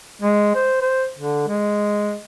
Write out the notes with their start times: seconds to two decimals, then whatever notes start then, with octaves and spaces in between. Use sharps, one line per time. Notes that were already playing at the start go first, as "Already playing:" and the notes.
0.22 G#3
0.55 C5
0.82 C5
1.18 D3
1.48 G#3